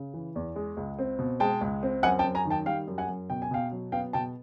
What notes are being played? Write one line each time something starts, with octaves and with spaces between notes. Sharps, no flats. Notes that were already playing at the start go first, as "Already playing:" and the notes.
Already playing: C#3
E3
E2
G#3
C#2
C4
B2
G#3 G5 A5
C#2
C4
F#2 F#5 G#5
G5 A5
F#2
G#5 A#5
D#3
G5 A5
G3 F5 G5
F#2
F#5 G#5
F#2
B2 G5
G#5
B2 F5 G5
F#3
B3 F5 G5
B2 G5 A5